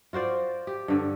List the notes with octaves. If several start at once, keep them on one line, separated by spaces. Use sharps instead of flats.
F4 F#4 C5 D5
G4
G2 D3